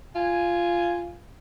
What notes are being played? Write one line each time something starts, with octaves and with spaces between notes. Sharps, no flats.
F4 G#5